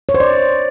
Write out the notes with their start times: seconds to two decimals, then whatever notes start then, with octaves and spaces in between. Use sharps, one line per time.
0.09 C#5
0.14 C5
0.20 D5